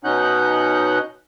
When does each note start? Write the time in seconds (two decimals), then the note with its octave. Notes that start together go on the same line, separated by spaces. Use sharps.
0.04 B2 C#4 D#4 F#5 F#6 G6